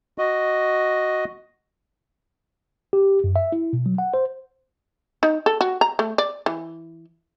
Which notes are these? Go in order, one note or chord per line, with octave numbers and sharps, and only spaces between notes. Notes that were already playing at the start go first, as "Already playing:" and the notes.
F#4 D#5
G4
F#2
E5
E4
B2
F#3
F#5
C5
D#4
A4
F#4
A#5
A3
D5
E3